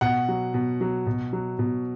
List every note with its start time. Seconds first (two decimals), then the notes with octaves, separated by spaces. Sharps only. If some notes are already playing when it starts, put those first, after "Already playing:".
0.01 B2 F#5
0.28 F#3
0.54 B2
0.81 F#3
1.06 B2
1.33 F#3
1.59 B2